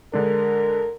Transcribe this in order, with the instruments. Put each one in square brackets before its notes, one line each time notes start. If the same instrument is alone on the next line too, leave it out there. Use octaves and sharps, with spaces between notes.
[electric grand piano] D3 G#3 D4 [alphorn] A#4